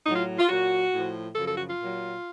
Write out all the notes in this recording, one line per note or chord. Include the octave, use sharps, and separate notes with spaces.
A2 F#3 D#4
F4
F4
A#2 F#3 F#4
A2 F3
F#2 C#3 F3 A4
A4
F#4
F4
A#2 F#3